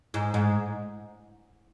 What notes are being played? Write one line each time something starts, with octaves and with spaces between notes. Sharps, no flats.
G#2
G#2